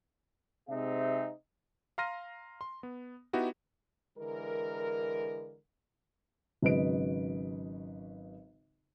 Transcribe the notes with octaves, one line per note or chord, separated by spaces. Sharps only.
C3 G#3 C4 D#4 G#4 E5
F5 A#5 C6 F6 A#6 D#7
C6
B3
B3 D#4 E4 F#4 G4
D3 E3 G#3 A#4
G#1 C#3 F#3 B4 D#5 D7